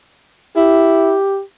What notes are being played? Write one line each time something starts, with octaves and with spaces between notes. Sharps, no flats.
E4 G4